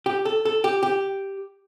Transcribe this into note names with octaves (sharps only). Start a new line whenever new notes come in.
G4
A4
A4
G4
G4